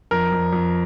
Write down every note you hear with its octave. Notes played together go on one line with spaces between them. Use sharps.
F2 A#4
F2
F2